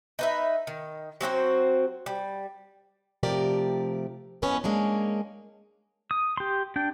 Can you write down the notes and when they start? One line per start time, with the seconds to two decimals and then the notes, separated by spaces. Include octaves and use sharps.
0.19 D#4 B4 E5
0.67 D#3
1.21 F#3 C4 F#4 C5
2.06 G3
3.23 C3 F3 A3 G4 A#4 D5
4.42 E2 B2 F3 B3 C#4 B4
4.64 G#3 A#3 C#4 D4
6.11 D#6
6.37 G4 C6
6.76 D4 G5